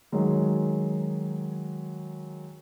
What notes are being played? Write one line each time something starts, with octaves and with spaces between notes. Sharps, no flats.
D#3 F#3 G#3